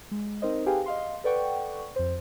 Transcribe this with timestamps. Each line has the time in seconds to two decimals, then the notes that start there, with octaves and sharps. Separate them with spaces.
0.11 G#3
0.42 C4 D#4 A#4 C5 D#5
0.66 G4 G#4 B4 F5 G5 G#5
0.86 D#5 F5 C6
1.24 A4 B4 D5 F#5 G5 C#6
1.96 F2 C5